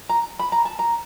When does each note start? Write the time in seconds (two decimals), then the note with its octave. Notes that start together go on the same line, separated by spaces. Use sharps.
0.09 A#5
0.39 B5
0.52 A#5
0.65 A5
0.79 A#5